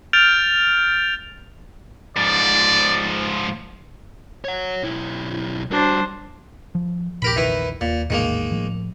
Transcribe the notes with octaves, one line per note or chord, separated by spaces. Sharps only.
F6 G6 A6 D7 F7
G#2 F3 D5
C#5 F#5
B1 E4
G3 D4 F#4 C5
F3
A#1 E2 A#2 G4 A#4 B5
D#3 E4 B4
D#2 A#2
A#1 E2 A2 D#3 G#3 A#3
A2 F3